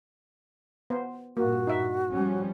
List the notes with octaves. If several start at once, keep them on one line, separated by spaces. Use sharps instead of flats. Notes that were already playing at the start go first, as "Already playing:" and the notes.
B3 C5
G2 A#2 A#3 F#4
D#4 E5
F3 G3 C#4